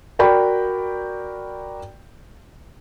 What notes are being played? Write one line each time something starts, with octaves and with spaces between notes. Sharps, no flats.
F#4 A#4 D5 G5 B5